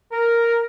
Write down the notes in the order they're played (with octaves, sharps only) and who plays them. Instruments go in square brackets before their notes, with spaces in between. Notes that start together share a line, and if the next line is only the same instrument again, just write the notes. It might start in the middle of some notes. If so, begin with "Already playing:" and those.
[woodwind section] A#4